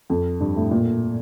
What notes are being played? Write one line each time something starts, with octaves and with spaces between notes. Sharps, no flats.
F2
G2
A2
A#2